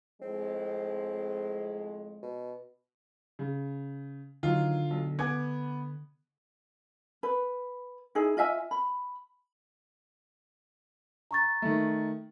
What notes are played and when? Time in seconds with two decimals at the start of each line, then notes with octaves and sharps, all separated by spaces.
0.22 F2 A2 G#3 C4
2.22 B2
3.39 C#3
4.43 D3 D#3 F#3 F4
4.90 B1
5.19 B3 G#5 D6 G#6
7.23 B4
8.15 D#4 E4 G#4
8.37 F4 D#5 E5 G#5
8.71 B5
11.31 A#5 C#6 A6
11.62 D#3 A3